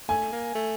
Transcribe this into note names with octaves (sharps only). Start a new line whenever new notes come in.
A3 G#5
A#3
A3